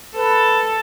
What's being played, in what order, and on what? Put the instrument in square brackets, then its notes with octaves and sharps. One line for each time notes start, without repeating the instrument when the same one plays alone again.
[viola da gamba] A4 [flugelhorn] B4